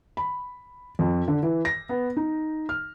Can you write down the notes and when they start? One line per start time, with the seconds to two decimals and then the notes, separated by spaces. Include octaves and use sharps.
0.17 B5
0.99 F2
1.28 D3
1.43 E3
1.65 A#6
1.89 B3
2.17 D#4
2.69 F6